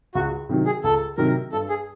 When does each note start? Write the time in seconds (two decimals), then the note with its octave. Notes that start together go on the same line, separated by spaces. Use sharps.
0.15 C#2 F#4
0.49 C3 D#3 F#3
0.66 G#4
0.84 C#2 A4
1.18 C3 D#3 F#3 A#4
1.52 G2 A4
1.69 G#4